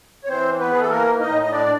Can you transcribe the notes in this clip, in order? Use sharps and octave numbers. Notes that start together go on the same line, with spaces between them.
C#5
E3 C4 C5
B3 B4
E3 G#4
A4
A#3 A#4
A2 D#4 D#5
D#5
D4 D5